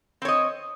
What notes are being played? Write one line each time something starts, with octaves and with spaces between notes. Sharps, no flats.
C4 C#5 D#5